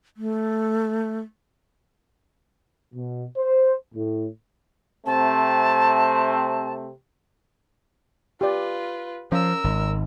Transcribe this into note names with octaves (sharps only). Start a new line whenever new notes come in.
A3
B2
C5
A2
C3 A3 C4 A5
F4 G4 B4 D5
F3 C#4 A#4 F5 E6
G#1